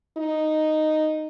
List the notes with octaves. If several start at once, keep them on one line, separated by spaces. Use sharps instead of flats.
D#4